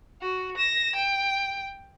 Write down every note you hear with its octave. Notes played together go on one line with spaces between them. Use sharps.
F#4
A#6 E7
G5